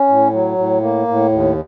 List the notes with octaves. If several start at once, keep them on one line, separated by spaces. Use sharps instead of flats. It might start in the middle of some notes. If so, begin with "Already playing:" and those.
Already playing: C#4
A2
F#3
A2
A#3
A2
D#2